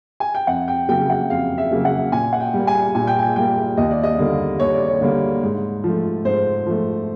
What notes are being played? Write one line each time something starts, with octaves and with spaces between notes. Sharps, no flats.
G#5
G5
F2 F#5
G5
C#3 F#3 A#3 G5
F#5
F2 F5
E5
C#3 F#3 A#3
F#5
A#2 G#5
F#5
G5
G3 A#3
G#5
A#2 G#5
G5
G#5
G3 A#3 G5
D#2 D#5
D5
D#5
D3 G3 A#3
D#2 C#5
D5
C#5
D3 G3 A#3
G#2
F3 A3
G#2 C5
F3 A3